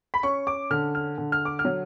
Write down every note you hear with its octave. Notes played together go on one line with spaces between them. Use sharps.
B5
C#4 C#6
D6
D3 F6
F6
D3
F6
D6
F6
F#3